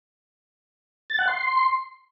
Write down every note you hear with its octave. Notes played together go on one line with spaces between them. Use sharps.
A6
F#5
C6